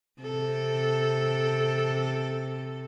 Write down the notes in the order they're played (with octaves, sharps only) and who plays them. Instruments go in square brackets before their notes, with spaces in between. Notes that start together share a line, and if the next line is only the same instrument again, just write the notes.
[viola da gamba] C3 A4